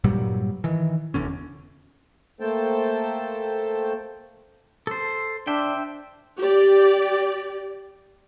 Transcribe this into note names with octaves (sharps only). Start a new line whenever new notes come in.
G2 A#2 F#3 G3
D#3 E3
F1 E2 D3 C#4
A3 A#3 A4 C5 G5 A5
A4 C5
D4 C5 E5 G5
G4 D5